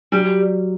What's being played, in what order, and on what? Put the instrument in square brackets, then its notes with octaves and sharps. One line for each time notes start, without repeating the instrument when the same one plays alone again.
[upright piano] F#3 [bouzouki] G3